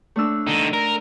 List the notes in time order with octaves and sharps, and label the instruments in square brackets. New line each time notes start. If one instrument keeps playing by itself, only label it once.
[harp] A3 D4 E6
[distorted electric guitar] D3 D#4
A#4